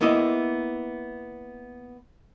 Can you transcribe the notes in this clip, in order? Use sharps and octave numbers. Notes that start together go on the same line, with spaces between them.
A#3 B3 E4 D#5